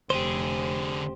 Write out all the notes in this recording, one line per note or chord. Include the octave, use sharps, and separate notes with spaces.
F1 D3 G4 G#4 C5